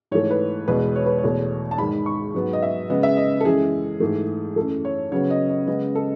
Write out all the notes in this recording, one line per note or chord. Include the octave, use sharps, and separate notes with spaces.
G#2 E3 A3 C#5
B4
E2 B2 G#3 B3 B4
C#5
B4
C#5
E2 B2 A3
A5
G#2 D#3 G#3 B5
C#6
G#2 F#3 B3
D#5
E5
C#3 G#3 B3 D#5
E5
D#5
A4
F#2 E3 G#3 G#4
G#2 E3 A3
F#2 E3 A3 A4
C#5
C#3 F#3 B3 C#5
D#5
D#5
C#3 G#3 B3 D#5
A4